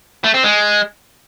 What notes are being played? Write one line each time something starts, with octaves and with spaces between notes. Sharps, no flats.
A3
C4
G#3